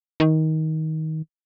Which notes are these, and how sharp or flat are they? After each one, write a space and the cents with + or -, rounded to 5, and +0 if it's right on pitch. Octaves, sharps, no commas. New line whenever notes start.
D#3 +20